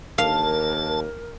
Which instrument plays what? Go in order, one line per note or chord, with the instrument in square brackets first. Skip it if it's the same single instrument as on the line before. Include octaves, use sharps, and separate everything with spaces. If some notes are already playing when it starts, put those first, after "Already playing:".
[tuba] D#2 [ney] A#4 [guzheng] F5 [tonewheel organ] A5